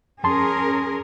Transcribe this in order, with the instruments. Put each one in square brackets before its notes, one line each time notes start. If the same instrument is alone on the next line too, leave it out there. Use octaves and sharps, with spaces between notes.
[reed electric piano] F2 A5 C6 [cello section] C#4 G#4 A#4